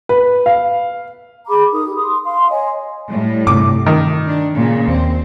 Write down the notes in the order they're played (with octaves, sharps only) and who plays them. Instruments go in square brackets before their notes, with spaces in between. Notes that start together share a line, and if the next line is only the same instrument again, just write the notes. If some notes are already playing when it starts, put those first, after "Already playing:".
[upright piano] B4
F5
[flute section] G#4 A#5 B5 D6
D#4 A#4 D#6
G4
C6 D#6
F5 C6
C#5 D#5 G#5
[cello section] A2 G3
[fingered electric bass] G2 C3 [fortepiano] D6
[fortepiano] D#3
[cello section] D4
A#2 C#3
[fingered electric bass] D#2 [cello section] C4